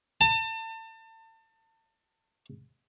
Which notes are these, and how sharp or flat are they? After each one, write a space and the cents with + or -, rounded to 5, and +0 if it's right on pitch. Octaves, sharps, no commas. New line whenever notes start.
A5 +35